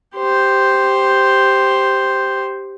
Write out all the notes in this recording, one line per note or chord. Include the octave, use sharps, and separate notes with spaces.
G4 C5